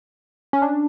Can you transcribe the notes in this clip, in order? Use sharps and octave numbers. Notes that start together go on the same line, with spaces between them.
C#4
D4